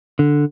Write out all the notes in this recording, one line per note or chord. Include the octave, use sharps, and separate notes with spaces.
D3